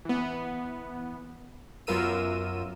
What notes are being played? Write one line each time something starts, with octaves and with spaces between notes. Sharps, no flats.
E3 B3
F#2 B3 F4 A#4 E6 D#7